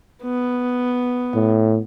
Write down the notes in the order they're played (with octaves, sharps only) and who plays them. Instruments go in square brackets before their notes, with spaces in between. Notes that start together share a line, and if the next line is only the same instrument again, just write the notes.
[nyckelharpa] B3
[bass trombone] A2